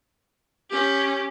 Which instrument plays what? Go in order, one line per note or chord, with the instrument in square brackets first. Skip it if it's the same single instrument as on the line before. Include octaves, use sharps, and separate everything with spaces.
[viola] C#4 G4